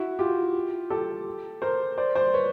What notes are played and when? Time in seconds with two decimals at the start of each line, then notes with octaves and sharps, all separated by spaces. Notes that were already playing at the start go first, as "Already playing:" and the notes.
Already playing: E4 F#4
0.19 F4 G4
0.90 G4 A4
1.62 A#4 C5
1.98 C5 D5
2.15 C5 D5
2.34 B4 C#5